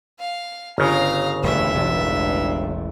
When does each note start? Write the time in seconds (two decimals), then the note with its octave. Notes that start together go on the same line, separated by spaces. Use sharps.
0.20 F5
0.78 G1 C#3 F5 A#5
1.43 E1 D2 G2 E5
1.74 E1 A1 G2